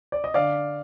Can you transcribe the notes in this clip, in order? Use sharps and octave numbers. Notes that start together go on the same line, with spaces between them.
D5
D#5
D3 D5 F5